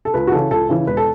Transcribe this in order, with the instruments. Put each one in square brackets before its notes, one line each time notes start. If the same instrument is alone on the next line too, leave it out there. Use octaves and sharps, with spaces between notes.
[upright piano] A4
C#2 B4
F#4
C#3 E3 A4
C#2 A4
C#3 E3
E1 B4
A4